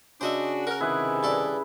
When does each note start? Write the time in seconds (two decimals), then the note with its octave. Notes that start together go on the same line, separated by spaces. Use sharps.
0.21 C#3 D4 F#4 C5 D#5 E5
0.67 F#4 A#4
0.81 C3 D#3 E4 G#4 B4
1.23 G2 A4 D5